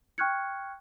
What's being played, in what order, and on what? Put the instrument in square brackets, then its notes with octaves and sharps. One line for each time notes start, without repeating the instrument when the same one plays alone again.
[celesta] G5 C#6 F6 F#6 G#6 C#7